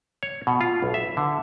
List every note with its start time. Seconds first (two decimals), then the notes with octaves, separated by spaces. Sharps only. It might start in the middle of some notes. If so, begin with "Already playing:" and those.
0.23 C#5
0.47 B2
0.61 F4
0.82 B1
0.94 E5
1.17 D3